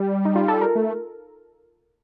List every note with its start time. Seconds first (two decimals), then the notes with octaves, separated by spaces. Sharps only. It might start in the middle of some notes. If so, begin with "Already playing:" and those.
Already playing: G3
0.25 D#4
0.36 F4
0.48 A4
0.61 A#4
0.75 A3